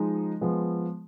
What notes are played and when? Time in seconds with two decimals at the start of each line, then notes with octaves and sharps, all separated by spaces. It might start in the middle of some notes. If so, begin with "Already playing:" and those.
Already playing: F3 G#3 D#4
0.41 F3 G#3 B3